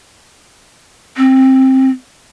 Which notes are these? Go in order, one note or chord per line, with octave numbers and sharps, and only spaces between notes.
C4